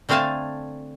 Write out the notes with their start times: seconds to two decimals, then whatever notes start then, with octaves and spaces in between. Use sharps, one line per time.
0.09 D3 A3 C4 F5 G#5 A5